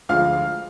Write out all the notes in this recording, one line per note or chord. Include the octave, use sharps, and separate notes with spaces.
D2 D3 F3 G#3 F5 F6